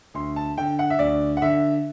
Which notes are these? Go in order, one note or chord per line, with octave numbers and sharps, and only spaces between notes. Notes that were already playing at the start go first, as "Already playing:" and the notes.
D2 C6
A5
D3 G5
F#5
E5
D2 D5
F#5
D3 E5